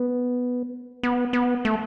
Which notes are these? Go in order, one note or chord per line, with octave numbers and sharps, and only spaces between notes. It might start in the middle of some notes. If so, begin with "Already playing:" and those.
Already playing: B3
B3
B3
A3